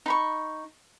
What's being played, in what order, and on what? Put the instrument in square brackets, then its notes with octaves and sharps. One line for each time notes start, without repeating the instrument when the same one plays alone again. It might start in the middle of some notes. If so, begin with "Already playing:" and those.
[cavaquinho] D#4 B5 C#6